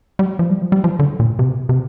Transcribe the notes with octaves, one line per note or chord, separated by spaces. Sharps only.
G3
F3
G3
F3
G3
F3
D3
A#2
C3
C3